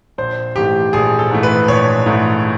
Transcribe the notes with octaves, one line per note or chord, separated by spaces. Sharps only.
A#1 C5
G#2 E3 A3 G4
A#1 G#4
A4
G#2 E3 A3
B4
A#1 C#5
G#2 E3 A3